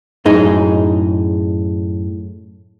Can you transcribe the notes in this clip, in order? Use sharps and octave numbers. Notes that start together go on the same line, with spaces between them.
F#2 A2 D#4 G#4 D#5